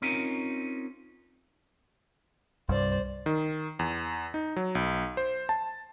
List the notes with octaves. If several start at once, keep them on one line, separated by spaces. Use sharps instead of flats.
C4 C#4 D#4 F4 A#4
C2 G2 C5 D5
D#3
E2
D#4
F#3
B1
C5
A5